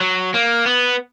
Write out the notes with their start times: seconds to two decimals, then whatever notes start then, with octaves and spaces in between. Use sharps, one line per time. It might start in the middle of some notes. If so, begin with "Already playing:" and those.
0.01 F#3
0.34 A#3
0.66 B3